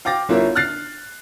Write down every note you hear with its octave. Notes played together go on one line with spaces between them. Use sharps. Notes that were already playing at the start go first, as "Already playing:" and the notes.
F5 G5 D6 A6 A#6
G1 E4 F4 A#4 C#5 E5
F6 F#6 A6 C7